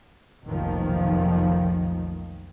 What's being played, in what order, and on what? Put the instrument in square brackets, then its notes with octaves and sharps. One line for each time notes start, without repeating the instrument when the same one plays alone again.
[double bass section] F1 B1 A#2 D#3 F3